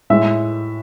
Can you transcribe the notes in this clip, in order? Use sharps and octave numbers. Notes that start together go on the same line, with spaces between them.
A2 G#3 E5